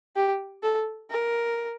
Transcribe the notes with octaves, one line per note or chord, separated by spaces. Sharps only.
G4
A4
A#4